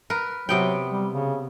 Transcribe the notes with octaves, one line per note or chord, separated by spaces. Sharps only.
A#4 B4
C3 F#3 B3 G5
G3
C#3